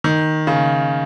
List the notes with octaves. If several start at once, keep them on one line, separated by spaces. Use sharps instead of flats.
D#3
C#3